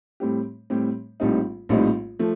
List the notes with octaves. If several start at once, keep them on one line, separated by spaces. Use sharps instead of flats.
A2 G3 C4 G4
A2 G3 C4 G4
A#1 A2 G3 C4 D#4
A#1 A2 G3 C4 D#4
F3 A3